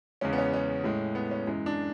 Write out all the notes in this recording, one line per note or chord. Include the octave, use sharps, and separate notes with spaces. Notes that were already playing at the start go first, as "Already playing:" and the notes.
E2 C#3 G#3 C#4
B3
C#4
C#4
A2 G#3
B3
C#4
F#2 E3 G#3
D4